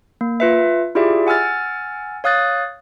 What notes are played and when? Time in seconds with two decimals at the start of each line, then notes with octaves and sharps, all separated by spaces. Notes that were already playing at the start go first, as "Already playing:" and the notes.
0.21 A#3
0.40 F4 B4 E5
0.95 E4 F4 G4 G#4 D5 E5
1.27 F#5 G#5 E6 F6 A6
2.24 C#5 F5 D#6 F#6 A6